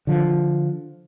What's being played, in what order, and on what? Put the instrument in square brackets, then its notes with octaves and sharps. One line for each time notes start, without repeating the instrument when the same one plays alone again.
[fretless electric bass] D3 F3